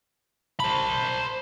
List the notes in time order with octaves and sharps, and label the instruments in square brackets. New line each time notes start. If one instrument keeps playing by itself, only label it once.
[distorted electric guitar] C5 B5 [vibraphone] A5